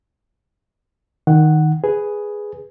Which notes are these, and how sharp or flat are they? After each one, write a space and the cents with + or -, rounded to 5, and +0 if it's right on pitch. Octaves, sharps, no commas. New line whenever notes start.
D#3 +0 F#5 +0
G#4 +0 B4 +0